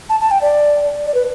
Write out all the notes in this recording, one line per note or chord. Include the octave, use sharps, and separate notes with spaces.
A5
A5
G5
D5
D5
B4